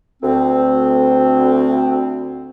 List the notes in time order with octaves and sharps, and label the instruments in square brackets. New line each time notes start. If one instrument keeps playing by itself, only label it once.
[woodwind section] D2 C4